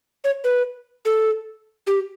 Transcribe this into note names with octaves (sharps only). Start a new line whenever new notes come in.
C#5
B4
A4
G4